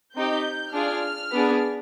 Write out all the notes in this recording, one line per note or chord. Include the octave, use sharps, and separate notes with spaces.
C4 D#4 G4 G6
D4 F4 G#4 F6
B3 D4 G#4